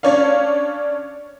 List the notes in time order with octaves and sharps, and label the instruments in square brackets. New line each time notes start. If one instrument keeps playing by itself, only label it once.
[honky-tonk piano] C#4 D4 C#5 D5 F5